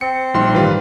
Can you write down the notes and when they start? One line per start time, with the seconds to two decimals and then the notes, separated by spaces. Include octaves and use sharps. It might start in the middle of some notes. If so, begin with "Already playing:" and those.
0.01 C4 C#7
0.34 A#1 G3 D#4 C6
0.55 G#2 D#3 E3 G3 F4 B4